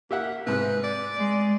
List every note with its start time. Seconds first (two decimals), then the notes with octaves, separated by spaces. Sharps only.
0.11 A#3 G4 E5 F#5
0.47 G#2 C3 B4
0.84 D5
1.17 G#3